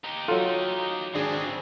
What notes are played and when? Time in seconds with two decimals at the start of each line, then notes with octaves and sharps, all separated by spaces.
0.04 D#4 G4
0.28 F#3 F4 A4
1.15 G#1 C#3 C4 D4 G#4